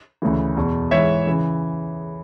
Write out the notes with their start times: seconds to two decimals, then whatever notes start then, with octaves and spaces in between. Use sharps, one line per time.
0.22 D2 C#3 E3
0.57 E2 B2
0.91 G#2 E3 C#5 E5
1.27 C#3 E3